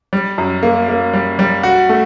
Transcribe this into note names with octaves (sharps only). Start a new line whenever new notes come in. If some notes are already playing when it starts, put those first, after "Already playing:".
G3
F#2
A#3
A#3
G3
G3
F#4
A3